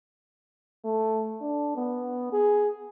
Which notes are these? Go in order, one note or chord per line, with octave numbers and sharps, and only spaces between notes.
A3
D4
B3
G#4